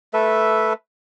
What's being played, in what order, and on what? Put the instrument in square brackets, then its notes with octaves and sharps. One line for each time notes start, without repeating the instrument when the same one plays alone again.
[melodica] A3 A4 B4 E5